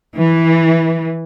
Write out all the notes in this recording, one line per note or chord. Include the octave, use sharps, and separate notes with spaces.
E3